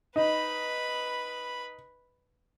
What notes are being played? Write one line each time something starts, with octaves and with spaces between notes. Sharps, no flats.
D#4 B4 B5